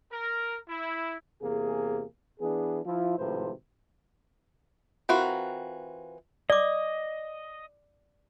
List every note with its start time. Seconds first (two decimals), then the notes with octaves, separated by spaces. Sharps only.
0.11 A#4
0.68 E4
1.42 E2 C3 A#3 G#4
2.40 E3 B3 D4 G#4
2.86 F3 E4 F4
3.18 G#1 A2 C3 F3 B4 C5
5.09 E3 C4 F4 F#4 A#4
6.50 D5 D#5 D6